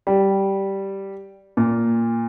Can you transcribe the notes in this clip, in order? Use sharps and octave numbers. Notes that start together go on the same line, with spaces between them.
G3
A#2